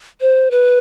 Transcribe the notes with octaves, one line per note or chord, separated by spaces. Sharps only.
C5
B4